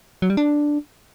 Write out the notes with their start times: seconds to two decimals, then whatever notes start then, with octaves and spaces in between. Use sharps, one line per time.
0.22 F#3
0.30 G3
0.37 D4